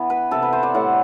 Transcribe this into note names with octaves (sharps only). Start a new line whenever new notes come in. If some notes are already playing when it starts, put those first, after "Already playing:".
Already playing: E3 B3
B4
C3 E3 B3 A4
B4
C5
D5
A2 G3 C4 F#5